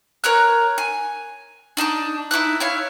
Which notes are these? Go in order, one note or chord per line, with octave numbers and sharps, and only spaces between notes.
A#4 C#5 A#5 F#6
G#5
D4 D#4 A5 D6
D#4 E4 D6 F#6
E4 C#5 F5